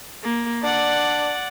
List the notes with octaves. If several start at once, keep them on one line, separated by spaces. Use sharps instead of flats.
A#3
D4 D5 F#5